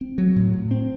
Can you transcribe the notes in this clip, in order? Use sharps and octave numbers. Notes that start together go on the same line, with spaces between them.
C4
F#3
A2
A2
C4